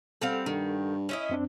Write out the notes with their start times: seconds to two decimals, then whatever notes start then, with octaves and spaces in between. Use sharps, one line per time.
0.21 G3 C4 A4 F5 F#5
0.46 G2 D#3
1.09 C#4 E4 D#5
1.29 F#2 C4 D4